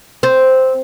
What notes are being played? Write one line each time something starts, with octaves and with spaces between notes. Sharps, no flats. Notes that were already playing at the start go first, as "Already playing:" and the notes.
C4